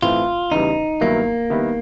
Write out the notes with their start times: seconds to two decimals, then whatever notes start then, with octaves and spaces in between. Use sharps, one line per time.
0.02 A2 E3 A3 C4 F4
0.52 E2 C#3 E3 G3 D#4
1.01 G2 D#3 F#3 A#3 B3 E4
1.50 D#3 G3 B3 E4